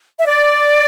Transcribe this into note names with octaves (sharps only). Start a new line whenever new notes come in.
E5
D5